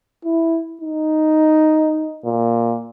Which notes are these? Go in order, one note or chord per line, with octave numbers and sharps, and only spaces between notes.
E4
D#4
A#2